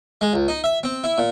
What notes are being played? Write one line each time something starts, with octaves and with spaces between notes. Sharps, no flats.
G#3
C#2
D#4
E5
C4
E4
A#2